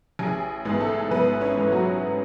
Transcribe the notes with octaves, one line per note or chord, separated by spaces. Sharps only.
A1 G#4 G#5
G#2 E3 G#3 B3
A3 A4
A1 B3 B4
C#4 C#5
G#2 E3 G#3 B3
F#3 F#4